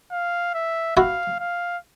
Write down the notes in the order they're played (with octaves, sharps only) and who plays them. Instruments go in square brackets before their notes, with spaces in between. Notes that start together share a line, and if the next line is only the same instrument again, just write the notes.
[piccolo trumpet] F5
E5
[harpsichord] E4 F#4 [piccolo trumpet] F5
[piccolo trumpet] F5